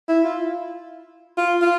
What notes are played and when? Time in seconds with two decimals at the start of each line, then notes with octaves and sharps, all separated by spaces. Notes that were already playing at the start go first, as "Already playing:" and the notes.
0.08 E4
0.24 F4
1.37 F4
1.62 F4